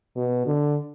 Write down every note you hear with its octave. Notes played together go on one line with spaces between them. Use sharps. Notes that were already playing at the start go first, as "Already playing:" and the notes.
B2
D3